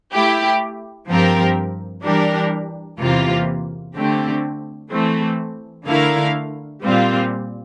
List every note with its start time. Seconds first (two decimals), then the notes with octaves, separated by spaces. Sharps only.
0.13 A3 E4 G4
1.08 G2 F3 C4 G4 A#4
2.04 E3 G3 D4 G4 A#4
3.00 E2 C3 E3 A#3 F4
3.96 D3 A3 C4 G4
4.91 E3 A3 C4
5.87 D3 A3 E4 A#4 F5
6.83 A#2 G3 C4 F4